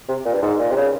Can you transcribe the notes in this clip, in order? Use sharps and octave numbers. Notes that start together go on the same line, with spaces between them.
C3
A#2
G2
G#2
A#2
C3
C#3